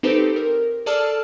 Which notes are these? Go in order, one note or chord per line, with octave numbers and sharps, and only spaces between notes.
C4 D#4 G4 A4 B4 C5
A#4
G#4 A4 D5 A5 E6 F6